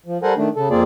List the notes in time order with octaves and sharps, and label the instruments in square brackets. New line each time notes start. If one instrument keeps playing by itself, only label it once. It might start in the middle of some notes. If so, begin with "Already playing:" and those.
[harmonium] F3
G3 A4 A#4 C5 F#5 G#5
D#3 A3 D4
C#3 A4
F2 A#3 C4 F4 G#4 D5